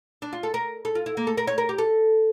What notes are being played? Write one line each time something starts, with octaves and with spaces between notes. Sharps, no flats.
D4
F4
A4
A#4
A4
F4
E4
A#3
A4
A#4
C#5
A#4
G4
A4